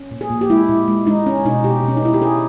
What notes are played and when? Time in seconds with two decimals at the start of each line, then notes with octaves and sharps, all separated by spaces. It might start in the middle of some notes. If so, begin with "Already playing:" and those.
Already playing: C#4
0.11 A#2
0.21 G#4
0.30 A#2
0.41 G4
0.50 G#3 E4
0.69 A#2
0.88 G#3
1.07 G#3 D#4
1.27 C#4
1.45 B2 D#4
1.64 B2 G4
1.84 B2 C#4
1.97 D#4
2.02 C#4 E4
2.14 G4
2.21 C#4 G#4